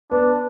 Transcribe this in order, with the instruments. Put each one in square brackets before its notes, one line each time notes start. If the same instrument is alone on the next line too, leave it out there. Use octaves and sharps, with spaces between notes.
[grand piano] B3 [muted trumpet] D4